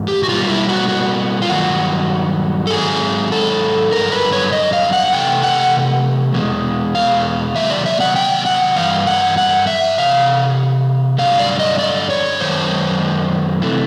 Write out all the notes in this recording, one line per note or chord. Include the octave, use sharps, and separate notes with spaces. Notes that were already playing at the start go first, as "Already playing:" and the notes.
Already playing: G#2 E3
G4
F#4
B2 G3 A#3 F4
E4
F#4
F#4
F4
G2 D#3 F#3 A#3 F#4
A4
G#2 D#3 F#3 G#4
A4
G2 D3 F#3 A#4
B4
C#5
D#5
F5
F#5
C3 E3 A3 G5
F#5
E2 B2 G#3
F5
C3 D#3 F#3 A#3 E5
D5
E5
F#5
G5
F#5
G2 E3 F5
F#5
F#5
E5
C3 E3 F5
G2 D3 F#3 A3 F5
D5
D#5
D5
C#5
F#2 D#3 G#3 C5
C3 E3 A3